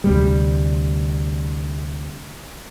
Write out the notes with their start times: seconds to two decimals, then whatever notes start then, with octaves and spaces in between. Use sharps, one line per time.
0.04 D2 C3 G3